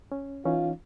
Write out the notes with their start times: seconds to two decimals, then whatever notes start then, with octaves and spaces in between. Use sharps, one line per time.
0.12 C#4
0.45 E3 C#4 D#4 F4